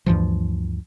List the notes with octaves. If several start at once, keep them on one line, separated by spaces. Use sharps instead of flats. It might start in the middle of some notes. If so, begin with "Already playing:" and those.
D2 G2 E3 F3